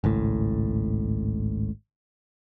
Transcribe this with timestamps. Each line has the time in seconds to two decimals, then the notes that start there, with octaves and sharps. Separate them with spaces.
0.04 G#1 C#2 A2